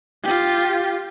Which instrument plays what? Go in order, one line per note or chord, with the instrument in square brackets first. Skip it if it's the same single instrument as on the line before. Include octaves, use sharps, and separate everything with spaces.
[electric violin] F4 G4